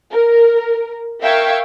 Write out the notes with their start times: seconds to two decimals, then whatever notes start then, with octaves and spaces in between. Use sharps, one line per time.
0.11 A#4
1.20 A#4 E5 F5 G5 C#6 G#6